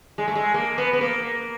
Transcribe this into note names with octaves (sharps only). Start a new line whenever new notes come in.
G#3
A3
G#3
A#3
B3
B3
A#3